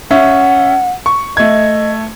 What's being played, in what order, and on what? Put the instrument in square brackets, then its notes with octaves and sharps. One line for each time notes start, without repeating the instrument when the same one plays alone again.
[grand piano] C#4 E5 [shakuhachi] F#5
[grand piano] C#6
[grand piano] A3 G#6 [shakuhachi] D#5